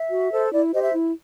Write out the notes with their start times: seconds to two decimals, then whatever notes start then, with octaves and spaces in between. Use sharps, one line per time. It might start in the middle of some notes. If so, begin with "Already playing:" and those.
Already playing: E5
0.11 F#4
0.31 A4 C5
0.52 E4 D5
0.72 G4 C5 D#5
0.82 E5
0.92 E4